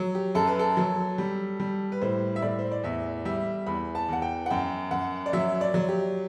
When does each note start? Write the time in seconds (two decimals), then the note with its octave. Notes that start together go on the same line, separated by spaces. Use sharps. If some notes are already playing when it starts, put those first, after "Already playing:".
Already playing: F#3
0.15 G4
0.35 F#2 A4
0.47 B4
0.59 A4
0.77 F#3
1.18 G3
1.60 G3
1.92 B4
2.01 A2 C5
2.36 E5
2.42 A2 D5
2.59 C5
2.72 D5
2.84 E2 E5
3.25 G3 E5
3.67 E2 B5
3.95 A5
4.08 E2 F#5
4.22 G5
4.46 F#5
4.50 F#2 G5
4.91 F#2 F#5
5.26 D5
5.33 F#3 E5
5.61 D5
5.74 F#3
5.89 G4